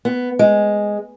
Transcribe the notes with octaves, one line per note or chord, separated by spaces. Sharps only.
B3
G#3